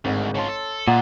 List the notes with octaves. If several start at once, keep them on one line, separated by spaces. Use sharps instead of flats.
G#1 D2 G#2
C#3 F4 C#5 A5 C6
A4
A#2 G#3 F4 F#5 A#5